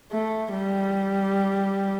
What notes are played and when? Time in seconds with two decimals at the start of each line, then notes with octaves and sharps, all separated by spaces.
0.12 A3
0.53 G3